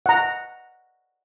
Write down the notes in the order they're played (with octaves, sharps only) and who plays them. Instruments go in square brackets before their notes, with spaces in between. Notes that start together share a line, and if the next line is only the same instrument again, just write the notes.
[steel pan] F#5 A#5